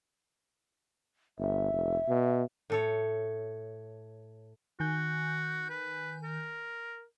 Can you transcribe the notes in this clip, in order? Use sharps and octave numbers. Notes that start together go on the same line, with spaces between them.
G1 E5
F1
B2
A2 A4 C#5
D#3 F#4 G#5 G6
B4
A#4